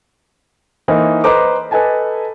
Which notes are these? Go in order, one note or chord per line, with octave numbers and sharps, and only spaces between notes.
E3 A#3 D#4 E4 C5
B4 C5 D#5 A#5 D6
A4 B4 D#5 G#5 A5